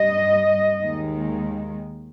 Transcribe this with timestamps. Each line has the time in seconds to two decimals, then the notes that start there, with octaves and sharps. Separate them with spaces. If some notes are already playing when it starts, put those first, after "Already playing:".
Already playing: G2 G3 D#5
0.82 D#2 D#3 G#3